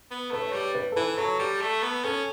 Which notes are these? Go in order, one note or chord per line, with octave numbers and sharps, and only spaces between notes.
B3
A3 B4
C#5
G3
B4
A4
E3 B4
F#3 A4
G3
A3
B3
C#4 A4